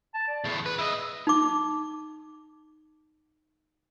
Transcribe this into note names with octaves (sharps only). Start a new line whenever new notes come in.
A5
D5
E2 A2 G#4
B4
E4 D#5
D#4 D6